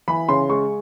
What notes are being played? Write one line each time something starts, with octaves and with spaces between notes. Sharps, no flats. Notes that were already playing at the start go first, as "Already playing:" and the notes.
E3 B5
C#3 C6
G#3 C#6